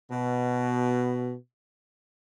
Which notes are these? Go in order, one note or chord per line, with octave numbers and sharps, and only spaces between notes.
B2